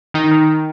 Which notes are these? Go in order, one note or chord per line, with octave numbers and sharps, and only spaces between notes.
D#3 D#4
D#3